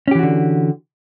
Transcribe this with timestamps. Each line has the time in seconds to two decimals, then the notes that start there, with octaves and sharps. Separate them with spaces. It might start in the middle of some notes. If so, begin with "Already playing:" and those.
0.08 C#4
0.11 G4
0.15 E3
0.19 F#4
0.23 D3